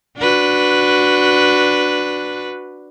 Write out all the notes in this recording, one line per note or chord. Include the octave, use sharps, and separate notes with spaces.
D4 F#4 B4